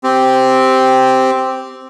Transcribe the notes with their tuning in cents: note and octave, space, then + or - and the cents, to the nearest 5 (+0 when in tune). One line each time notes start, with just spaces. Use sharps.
C4 +0 G4 -5